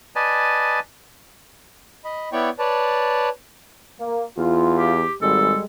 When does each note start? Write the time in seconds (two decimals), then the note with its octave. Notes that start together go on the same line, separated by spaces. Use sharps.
0.16 B4 D5 D#5 G#5 A5
2.05 D#5 B5
2.33 B3 E4 C#5 D5 G5 C#6
2.59 B4 C#5 D5 A5
4.00 A#3
4.38 E2 F4
4.76 G4
5.22 G#1 G3 G#3 A4